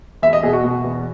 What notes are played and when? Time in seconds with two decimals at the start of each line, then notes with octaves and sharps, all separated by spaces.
0.22 E2 E5
0.33 D#5
0.43 B2 G#4
0.53 F#4
0.64 B2
0.84 E2